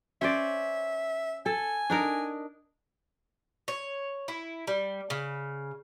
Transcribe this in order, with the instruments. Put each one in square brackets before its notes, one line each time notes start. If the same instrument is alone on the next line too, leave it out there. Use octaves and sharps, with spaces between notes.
[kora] C#4 C5 D5 [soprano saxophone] E5
[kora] A4 [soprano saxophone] G#5
[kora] D4 D#4 A#4
[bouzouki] C#5
E4
G3
C#3